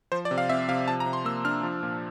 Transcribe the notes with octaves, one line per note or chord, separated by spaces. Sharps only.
F3 C5
D5
C3
F5
C4 E5
C3 F5
F3 A5
A#5
C3
C6
A#3 E6
D4 F6
F3
A#2